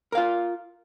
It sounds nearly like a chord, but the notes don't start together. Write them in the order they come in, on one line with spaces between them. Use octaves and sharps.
A#4 F5 F4